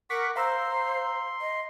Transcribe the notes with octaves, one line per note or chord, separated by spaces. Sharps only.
A#4 F#5 C#6 D6 B6
C5 F5 A#5 C6 E6
D#5